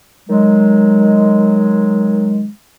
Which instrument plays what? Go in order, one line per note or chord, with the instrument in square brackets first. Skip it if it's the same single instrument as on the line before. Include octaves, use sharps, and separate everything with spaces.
[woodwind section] D#3 F#3 G#3